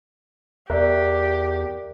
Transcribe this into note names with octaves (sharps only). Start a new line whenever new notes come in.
E2 G4 A#4 D5 E5 F#6